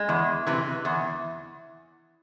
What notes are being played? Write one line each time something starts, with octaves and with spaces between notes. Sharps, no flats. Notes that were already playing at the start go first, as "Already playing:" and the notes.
Already playing: G#3
E2
C3 E3
E2